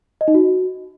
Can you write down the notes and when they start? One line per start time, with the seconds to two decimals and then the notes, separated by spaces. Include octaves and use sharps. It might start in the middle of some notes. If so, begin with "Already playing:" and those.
0.21 D#5
0.28 D#4
0.34 F#4